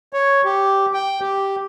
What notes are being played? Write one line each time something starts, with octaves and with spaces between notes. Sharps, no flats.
C#5
G4
G5
G4